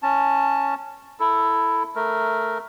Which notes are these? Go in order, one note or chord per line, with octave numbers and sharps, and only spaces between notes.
C#4 A5
E4 A4
A3 A#4